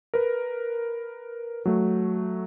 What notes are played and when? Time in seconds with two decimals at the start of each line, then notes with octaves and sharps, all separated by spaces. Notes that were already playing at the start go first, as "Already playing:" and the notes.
0.14 A#4 B4
1.66 F#3 A3